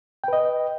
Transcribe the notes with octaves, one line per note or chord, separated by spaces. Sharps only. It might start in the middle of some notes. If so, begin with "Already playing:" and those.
B4 D#5 G5